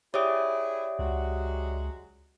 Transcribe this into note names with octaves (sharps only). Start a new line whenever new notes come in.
E4 G4 G#4 C#5 D5 E5 G5 D#6
C#2 F#3 G#3 F#4